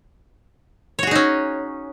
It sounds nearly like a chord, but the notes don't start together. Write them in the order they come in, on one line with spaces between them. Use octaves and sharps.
C#5 F#4 G#4 D#4 C#4